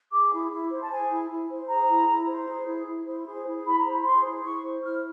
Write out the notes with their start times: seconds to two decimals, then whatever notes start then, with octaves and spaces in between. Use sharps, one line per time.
0.12 G#4 D6
0.32 E4
0.51 E4
0.70 C5
0.80 A5
0.90 G#4 G#5
1.10 E4
1.30 E4
1.50 C5
1.68 G#4 A#5
1.89 E4
2.08 E4
2.28 C5
2.47 G#4
2.67 E4
2.87 E4
3.06 C5
3.26 G#4
3.45 E4
3.65 E4 B5
3.78 A#5
3.85 C5
3.91 B5
4.04 G#4 C6
4.24 E4
4.43 E4 C#6
4.63 C5
4.82 E4 F6